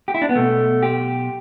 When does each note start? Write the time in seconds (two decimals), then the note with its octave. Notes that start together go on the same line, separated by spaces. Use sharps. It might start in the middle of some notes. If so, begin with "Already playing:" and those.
0.08 G4
0.14 E4
0.22 D4
0.29 B3
0.35 B1 B2 A3
0.83 G4